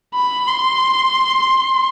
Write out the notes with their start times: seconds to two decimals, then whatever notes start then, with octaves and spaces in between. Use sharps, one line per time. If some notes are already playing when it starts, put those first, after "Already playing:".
0.15 B5
0.48 C6